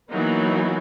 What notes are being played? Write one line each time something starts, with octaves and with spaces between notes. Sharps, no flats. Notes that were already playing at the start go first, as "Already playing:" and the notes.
E3 F#3 A#3 B3 D#4